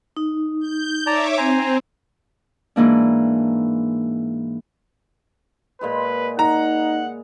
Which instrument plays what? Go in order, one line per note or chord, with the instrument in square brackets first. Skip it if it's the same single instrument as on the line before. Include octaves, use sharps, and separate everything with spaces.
[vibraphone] D#4
[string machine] G6
[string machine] C#5 E5 D6 [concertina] D5 A5 A#5
[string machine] C4 [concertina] C5 G#5 A#5
[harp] G#2 E3 A#3 D4
[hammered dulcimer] A#2 G#3 B5 [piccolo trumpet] B4
[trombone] D#4 [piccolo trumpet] F#5 [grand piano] A#5